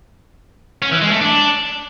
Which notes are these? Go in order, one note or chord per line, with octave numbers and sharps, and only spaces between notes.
C#4
E3
G#3
A3
D4